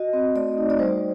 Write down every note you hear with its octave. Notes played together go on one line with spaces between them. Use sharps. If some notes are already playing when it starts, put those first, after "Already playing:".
Already playing: F#4 D#5
C4
A3 D5
D#4
D5
G3 C5